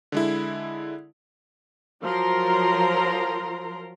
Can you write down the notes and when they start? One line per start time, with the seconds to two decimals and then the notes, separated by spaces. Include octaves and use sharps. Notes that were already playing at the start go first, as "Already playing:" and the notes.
0.12 D3 G#3 E4
2.02 F3 F#3 F4 A#4 A#5 C6